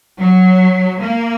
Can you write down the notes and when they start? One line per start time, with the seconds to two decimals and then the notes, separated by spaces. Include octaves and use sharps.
0.19 F#3
1.01 A#3